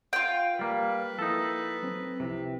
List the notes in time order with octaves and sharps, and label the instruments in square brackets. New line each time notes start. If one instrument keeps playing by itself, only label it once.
[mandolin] F4 G5
[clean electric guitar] G3 A#3 [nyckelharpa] B4
[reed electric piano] F3 A#3 E4 [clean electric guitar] D#4 A4
[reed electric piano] F#3 C4
[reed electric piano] C2 F3 E4 [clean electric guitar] C3